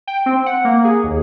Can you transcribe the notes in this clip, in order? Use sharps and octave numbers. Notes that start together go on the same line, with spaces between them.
G5
C4
F#5
A#3
G#4
D#2